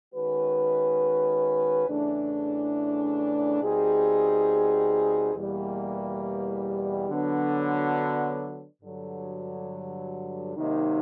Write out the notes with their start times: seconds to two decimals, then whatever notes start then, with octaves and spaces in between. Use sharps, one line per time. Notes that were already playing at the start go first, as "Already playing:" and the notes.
0.13 D#3 G#3 C#4 F#4 B4
1.87 E2 C#3 E3 A3 D4
3.61 B2 G3 C4 D#4 G#4
5.34 E2 B2 G3 A#3
7.08 D3 F#3 B3 D4
8.82 G2 D3 F#3
10.56 C3 D#3 F#3 A#3 D#4